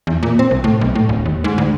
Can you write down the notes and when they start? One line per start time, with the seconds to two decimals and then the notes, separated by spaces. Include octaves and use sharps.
0.07 E2
0.23 A#2
0.39 C4
0.51 C2
0.64 A2
0.81 B1
0.95 A2
1.09 D1
1.26 D#2
1.44 G#2
1.58 D2